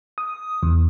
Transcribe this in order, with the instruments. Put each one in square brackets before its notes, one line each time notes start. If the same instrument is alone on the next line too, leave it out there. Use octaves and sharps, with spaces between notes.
[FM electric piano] D#6
E2